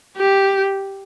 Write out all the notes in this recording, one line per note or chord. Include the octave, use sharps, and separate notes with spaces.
G4